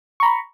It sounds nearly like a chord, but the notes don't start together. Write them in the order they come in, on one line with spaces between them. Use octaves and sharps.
C#6 A#5 B5